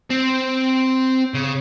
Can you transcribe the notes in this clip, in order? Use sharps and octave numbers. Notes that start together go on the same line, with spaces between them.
C4
C#3